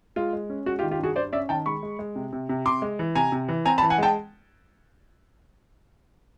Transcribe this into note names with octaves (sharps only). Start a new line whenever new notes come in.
G#3 F4
G#3
C#4
G#3 F#4
F4 G4
D#3
F4 G4
G2 F#4 G#4
G2 C5 D5
C#4 D5 E5
D#3 G5 A5
G#3 B5 C#6
G#3
G#3
C3
C3
C3
C3 C6 D6
G#3
E3
C3 G#5 A#5
C3
E3
C4 G#5 A#5
A5 B5
E3
F#5 G#5
G#3 G5 A5